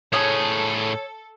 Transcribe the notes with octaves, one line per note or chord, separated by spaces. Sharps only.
A2 G#4 A4 C#5 D#6